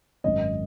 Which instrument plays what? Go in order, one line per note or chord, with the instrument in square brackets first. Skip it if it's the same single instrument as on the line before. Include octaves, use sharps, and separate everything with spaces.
[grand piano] G#1 F#2 D#3 D#5